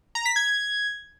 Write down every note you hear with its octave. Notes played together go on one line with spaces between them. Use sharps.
A#5
B6
G#6